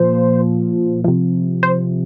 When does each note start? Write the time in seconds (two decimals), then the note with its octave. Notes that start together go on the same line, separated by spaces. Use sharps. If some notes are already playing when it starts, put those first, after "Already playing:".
Already playing: A#2 F3 C5
1.04 C3 F3
1.63 C5